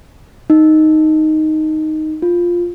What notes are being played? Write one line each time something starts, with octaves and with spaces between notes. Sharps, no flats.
D#4
F4